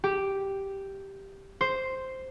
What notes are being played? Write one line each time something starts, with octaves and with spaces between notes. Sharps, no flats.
G4
C5